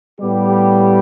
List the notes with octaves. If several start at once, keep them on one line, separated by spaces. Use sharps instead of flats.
A2 G3 B3 G4